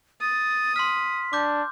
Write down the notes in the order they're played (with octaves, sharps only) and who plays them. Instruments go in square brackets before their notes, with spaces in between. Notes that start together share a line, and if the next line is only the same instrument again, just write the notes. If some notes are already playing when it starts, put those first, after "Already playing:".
[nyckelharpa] D#6 [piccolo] A6
[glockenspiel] C6 F6 [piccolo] B6
[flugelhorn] D4 [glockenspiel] D6 G6